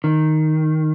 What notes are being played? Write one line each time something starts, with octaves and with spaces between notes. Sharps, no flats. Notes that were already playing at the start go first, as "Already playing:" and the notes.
D#3